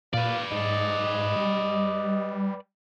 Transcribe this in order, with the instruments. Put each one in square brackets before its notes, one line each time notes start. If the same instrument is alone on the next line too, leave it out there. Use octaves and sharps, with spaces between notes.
[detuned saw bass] A#2 [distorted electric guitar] B4 D5 [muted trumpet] F5
[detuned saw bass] G#2 [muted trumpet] D#5
[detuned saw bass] G3